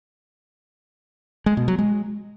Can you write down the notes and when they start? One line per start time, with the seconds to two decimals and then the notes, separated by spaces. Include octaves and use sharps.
1.46 G#3
1.57 B2
1.68 F#3
1.79 G#3